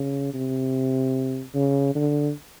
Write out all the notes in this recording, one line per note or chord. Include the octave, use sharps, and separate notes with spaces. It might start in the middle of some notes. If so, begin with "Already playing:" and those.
Already playing: C#3
C3
C#3
D3